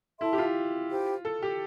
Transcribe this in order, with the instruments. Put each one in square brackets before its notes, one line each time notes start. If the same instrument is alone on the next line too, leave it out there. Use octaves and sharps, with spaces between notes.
[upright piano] E4 [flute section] A4 E5 A5 C6
[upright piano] G4
F4
[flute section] E4 G4 C5 G5
[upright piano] A4
G4